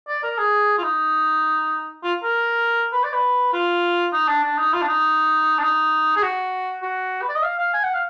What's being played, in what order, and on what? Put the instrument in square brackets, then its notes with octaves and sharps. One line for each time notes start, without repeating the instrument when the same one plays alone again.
[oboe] D5
A#4
G#4
F4
D#4
F4
A#4
B4
D5
B4
F4
D#4
D4
D4
D#4
F4
D4
D#4
D4
D#4
G#4
F#4
F#4
B4
D5
D#5
F5
F5
G#5
F#5
F5